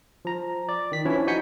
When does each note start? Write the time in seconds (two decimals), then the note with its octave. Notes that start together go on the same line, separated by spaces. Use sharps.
0.25 F3 A#5
0.69 D5
0.92 D#3 B6
1.05 E3 F3 C#4 D4 E4 C#5
1.27 D#4 F#4 G#5 G6 B6 C#7